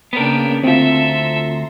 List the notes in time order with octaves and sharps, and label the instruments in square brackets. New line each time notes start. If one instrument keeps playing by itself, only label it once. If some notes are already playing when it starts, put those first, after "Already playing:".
[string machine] C#3 A#3 [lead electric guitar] B3 A#4 [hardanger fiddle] D4 G5
[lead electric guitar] D2 [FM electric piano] C4 F4 [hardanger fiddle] A4 E5 [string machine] A#5 C6